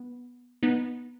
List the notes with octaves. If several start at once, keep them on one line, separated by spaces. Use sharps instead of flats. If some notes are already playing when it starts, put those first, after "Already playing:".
Already playing: B3
B3 D#4